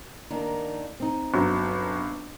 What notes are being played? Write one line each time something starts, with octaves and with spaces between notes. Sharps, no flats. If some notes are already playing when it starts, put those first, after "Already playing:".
D#3 A#3 D4
C4 D#4
G1 F#3